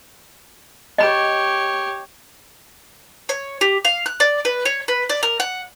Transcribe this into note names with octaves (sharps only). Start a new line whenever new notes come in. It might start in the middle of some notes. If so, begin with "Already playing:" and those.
G4 C#5 D#5 B5
C#5
G4
F5
F#6
D5
B4
C#5
B4
D5
A#4
F#5